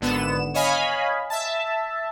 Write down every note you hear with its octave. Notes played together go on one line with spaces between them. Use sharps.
G#1 D3 B3 E7
C#5 D#5 F5 G#5 B5
E5 A5